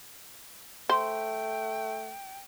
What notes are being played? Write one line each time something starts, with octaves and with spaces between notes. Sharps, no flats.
A3 C5 G5